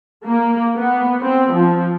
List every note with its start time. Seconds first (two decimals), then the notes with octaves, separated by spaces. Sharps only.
0.25 A#3
0.78 B3
1.22 C4
1.53 F3